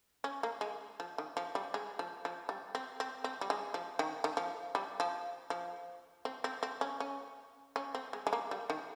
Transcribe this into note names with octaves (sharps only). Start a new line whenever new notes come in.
C#4
A#3
G#3
F3
D#3
F3
G3
G#3
F3
F3
G3
C4
C4
C4
G3
G#3
F3
D#3
D#3
F3
G3
F3
F3
C4
C4
C4
C#4
C#4
C#4
C4
G#3
G#3
A#3
G3
D#3